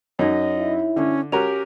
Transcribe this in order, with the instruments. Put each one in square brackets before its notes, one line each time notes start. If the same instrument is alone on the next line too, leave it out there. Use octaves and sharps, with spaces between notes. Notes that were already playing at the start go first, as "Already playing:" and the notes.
[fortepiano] F#2 [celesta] D#4 C#5 [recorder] D#5
[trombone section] E4
[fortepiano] D3 [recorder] C#4
[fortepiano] C#4 F#4 A#4 [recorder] G4 [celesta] F7